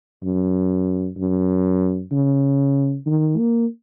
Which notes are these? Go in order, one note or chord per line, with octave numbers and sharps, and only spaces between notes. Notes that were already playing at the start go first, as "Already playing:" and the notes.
F#2
F#2
C#3
D#3
A#3